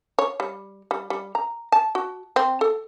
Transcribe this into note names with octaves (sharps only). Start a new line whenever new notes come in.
C#5
G3
G3
G3
A#5
A5
F#4
C4
A4